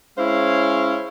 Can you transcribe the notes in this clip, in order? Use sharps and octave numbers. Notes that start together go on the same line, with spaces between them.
G#3 C#4 E4 C5 C#5 F5